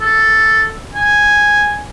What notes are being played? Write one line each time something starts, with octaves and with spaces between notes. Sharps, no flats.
A4
G#5